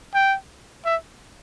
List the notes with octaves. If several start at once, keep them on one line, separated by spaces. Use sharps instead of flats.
G5
E5